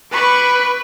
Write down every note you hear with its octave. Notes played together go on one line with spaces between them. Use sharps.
B4 B5 C#6 D6